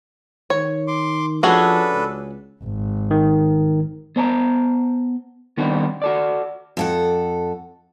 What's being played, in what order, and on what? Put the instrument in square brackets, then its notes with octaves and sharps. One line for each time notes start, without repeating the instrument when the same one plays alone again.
[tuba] D#3 [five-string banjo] C#5
[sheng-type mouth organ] C6 D6
[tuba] F3 [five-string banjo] C#4 F#4 G#4 [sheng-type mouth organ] D4 A4 B4
[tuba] C#2
[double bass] G#1
[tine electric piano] D#3
[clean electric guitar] B3 C5 A5 A#5
D#3 G3 B3 C4 D4 D#4
F#4 A4 D5
[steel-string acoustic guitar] F2 A4 F#5